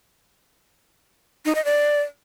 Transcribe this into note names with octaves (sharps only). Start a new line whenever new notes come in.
D#4
D#5
D5